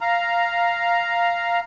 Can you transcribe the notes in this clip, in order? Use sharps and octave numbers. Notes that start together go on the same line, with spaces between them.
F5 A#5